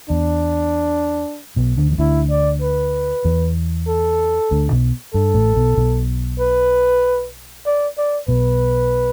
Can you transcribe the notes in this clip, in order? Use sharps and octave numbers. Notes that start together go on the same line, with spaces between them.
E2 D4
B1 B2
D2 D3
E3
D2 D3 E4
D5
B4
E2 E3
A4
D2 D3
B1 B2
G2 A4
A1 A2
B1 B2
B1 B2
B4
D5
D5
B1 B2 B4